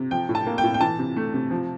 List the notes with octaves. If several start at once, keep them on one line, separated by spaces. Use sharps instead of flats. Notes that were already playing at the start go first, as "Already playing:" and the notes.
Already playing: C3
F3 G5
A2
A5
A#3
G5
A2
G5
E3 A5
C3
A3
C3
F3